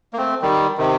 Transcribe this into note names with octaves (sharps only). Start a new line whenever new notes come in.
A#3
A3 C4
D#3 G3
C3 D#3